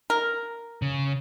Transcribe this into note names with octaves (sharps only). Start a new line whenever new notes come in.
A#4
C#3